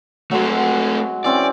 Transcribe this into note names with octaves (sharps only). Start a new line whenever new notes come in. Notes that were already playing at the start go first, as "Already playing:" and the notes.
F#3 G#3 A3 C4 F#4
E3 C4 C#4 D5